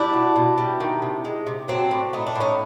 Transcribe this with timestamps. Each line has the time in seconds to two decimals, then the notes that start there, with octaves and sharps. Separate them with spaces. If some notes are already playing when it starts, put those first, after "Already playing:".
Already playing: G3 D4 E4
0.13 B2
0.36 B2
0.58 G3
0.80 D#3
1.02 C3
1.25 G#3
1.47 C3
1.68 F#3 C4 D4
1.91 A2
2.13 A3 D#4
2.27 D4
2.35 A2
2.40 C#4 D#4